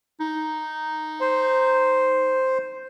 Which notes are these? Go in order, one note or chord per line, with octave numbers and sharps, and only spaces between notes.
D#4
C5